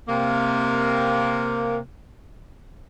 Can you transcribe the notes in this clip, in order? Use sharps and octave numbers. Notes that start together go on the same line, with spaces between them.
C3 A#3